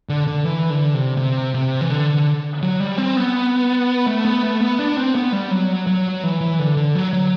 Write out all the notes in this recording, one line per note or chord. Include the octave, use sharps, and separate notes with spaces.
D3
D3
E3
D3
C3
C3
C3
E3
D3
F#3
G3
C4
B3
A3
B3
A3
B3
D4
C4
B3
G3
F#3
F#3
E3
E3
D3
D3
F#3
F#3